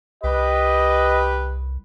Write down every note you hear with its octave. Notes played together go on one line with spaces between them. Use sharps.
C2 G4 B4 D#5